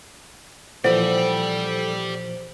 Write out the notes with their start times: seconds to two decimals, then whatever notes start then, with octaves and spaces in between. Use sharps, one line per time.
0.84 A#2 E3 F3 G4 A4 C5 D5 F#7